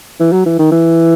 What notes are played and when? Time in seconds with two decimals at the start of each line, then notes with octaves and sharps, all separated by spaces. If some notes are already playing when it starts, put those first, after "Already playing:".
0.20 E3
0.32 F#3
0.46 E3
0.59 D#3
0.72 E3